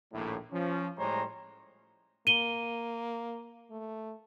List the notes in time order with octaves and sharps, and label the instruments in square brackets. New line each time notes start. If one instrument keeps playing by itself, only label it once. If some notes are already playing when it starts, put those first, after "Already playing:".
[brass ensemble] A#1 D#2 A2
F3 C#4
A2 G3 G#3 C5 C#5 A#5
[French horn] A#3 [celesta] D#7 G7
[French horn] A3